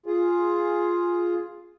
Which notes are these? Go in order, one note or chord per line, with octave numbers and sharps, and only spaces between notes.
F4 G#4